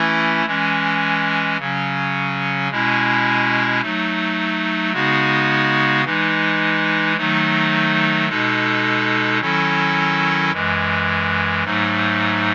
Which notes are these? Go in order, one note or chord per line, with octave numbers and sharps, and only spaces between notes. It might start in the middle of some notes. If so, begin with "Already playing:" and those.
Already playing: E3 A3 C#4 E4
E3 G#3 C#4
C#3 F#3 C#4
B2 G#3 C#4 E4
F#3 A3 D#4
C#3 G#3 B3 D#4 F#4
E3 G#3 D#4
D#3 F#3 A3 D#4
B2 G#3 D#4 A4
D#3 F#3 C#4 E4 A4
F#2 E3 G#3
G#2 F#3 A3 D#4